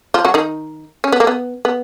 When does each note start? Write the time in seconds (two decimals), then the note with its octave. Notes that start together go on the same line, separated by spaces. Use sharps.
0.14 F3 F4
0.25 F#3 F#4
0.34 D#3 D#4
1.04 C#4
1.12 B3
1.20 A#3
1.27 B3
1.65 B3